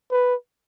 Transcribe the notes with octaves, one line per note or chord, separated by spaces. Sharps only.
B4